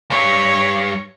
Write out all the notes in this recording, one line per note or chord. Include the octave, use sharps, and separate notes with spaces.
C#2 G2 C#5